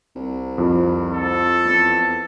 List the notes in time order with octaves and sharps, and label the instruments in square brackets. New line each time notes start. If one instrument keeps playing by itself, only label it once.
[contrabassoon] C2
[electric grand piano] F2
[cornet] A4
[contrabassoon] E2